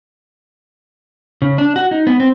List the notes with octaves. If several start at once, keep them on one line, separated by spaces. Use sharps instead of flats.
C#3
D4
F#4
D#4
B3
C4